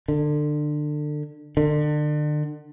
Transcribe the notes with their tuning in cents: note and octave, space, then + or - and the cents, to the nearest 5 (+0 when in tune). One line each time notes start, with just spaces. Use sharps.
D3 +25
D3 +35